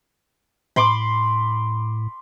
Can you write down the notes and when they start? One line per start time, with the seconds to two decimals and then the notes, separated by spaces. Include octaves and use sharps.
0.76 A2 B5 C6 D6